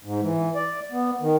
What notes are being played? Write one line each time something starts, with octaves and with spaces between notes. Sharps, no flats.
G#2
E3
D5
B3
D#3